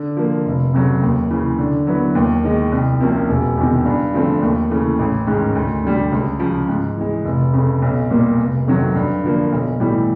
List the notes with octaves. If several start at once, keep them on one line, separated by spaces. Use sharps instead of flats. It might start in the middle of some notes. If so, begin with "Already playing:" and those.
Already playing: D3
F3 A#3
F1
F2 C#3 F#3
D#2
C#3 E3
D3
F#3 B3 E4
D#2
D#3 G#3
C2
C3 F3 A#3 C#4
E1
E2 C3 D#3
G2
D3 F3 A3 C4
D#2
C#3 E3 A3
A1
G#2 D#3 G#3 C#4
D2
D3 G3
C#2
C#3 F3
G#2
E3 G#3
F1
F2 C#3
B1
A#2 G3 A#3
F1
F2 C3 D#3 F#3
G2
D3 F3 A#3
B1
A2 E3 G3